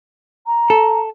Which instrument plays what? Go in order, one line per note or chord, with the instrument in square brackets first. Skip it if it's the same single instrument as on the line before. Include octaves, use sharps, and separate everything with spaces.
[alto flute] A#5
[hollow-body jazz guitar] A4